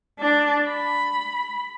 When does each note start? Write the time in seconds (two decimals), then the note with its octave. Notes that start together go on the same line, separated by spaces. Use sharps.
0.19 D4
0.70 B5